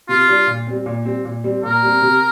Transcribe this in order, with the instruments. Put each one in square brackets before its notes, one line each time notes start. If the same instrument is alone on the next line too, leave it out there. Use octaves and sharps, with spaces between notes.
[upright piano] C3 [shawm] F4
[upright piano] G3 D4
A#2
G3 C4
A#2
G3 C4
A#2
G3 C4
[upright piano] A#2 [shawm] A#4
[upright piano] G3 C4
C3